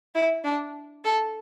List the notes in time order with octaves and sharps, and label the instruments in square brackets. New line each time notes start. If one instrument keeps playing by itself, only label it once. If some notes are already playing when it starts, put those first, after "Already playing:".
[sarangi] E4
D4
A4